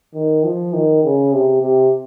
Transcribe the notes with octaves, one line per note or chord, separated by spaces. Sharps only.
D#3
F3
D#3
C#3
C3
C3